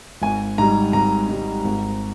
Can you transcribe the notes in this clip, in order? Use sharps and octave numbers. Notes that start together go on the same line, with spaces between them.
G#1 G#5
G#2 G3 A#5
G#1 A#5
G#2 G3
G#1